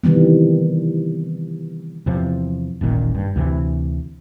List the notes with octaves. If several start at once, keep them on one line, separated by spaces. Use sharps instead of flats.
C3 D#3 E3 G3 B3
E2 C3 F3
D#1 A1 A#2 D#3
G2
D2 C3 E3